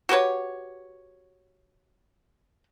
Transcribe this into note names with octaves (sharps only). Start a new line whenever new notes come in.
F#4 G4 B4 C#5